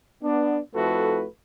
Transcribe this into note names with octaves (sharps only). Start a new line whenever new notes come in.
B3 D4
F2 A3 E4 F#4 A4 B4